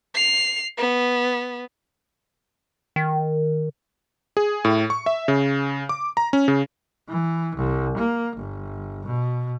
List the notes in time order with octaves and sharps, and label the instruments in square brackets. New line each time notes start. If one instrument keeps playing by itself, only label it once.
[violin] C7 F7
B3
[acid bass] D#3
[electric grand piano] G#4
A2
C#6
E5
C#3
D6
A#5
C#4
C#3
[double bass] E3
C2
A#3
G1
B2